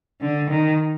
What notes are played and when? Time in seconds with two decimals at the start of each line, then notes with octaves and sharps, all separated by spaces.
0.21 D3
0.50 D#3